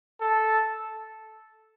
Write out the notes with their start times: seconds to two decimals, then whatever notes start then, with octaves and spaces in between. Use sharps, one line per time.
0.21 A4